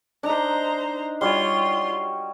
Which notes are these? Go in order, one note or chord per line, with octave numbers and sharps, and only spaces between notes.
D4 D#4 C5 A#5
G3 F4 F#4 C#5 C6